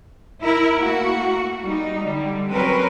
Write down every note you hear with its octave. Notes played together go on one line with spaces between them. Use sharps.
E4 A#4
A3 A#3 F#4
G3 D#4
D3 G3
F#3 C4 C#4 A#4 B4